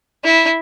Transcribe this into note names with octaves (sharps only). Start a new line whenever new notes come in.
E4